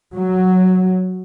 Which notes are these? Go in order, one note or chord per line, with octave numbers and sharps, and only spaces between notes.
F#3